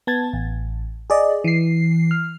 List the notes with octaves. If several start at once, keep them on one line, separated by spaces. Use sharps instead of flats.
B3 A5 G#6 A6
A1
G#4 D5 D#5
E3 C7
F6